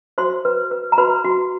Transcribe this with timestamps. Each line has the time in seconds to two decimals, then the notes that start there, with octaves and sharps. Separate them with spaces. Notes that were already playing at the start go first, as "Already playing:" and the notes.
0.18 F#4 C5 C6
0.45 B4
0.71 B4
0.92 A#5
0.98 F#4 B4 B5
1.24 F#4